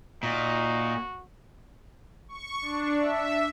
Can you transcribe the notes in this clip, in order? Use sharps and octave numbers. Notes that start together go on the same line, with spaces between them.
A#2 D#4 F#4
C#6
D4
E5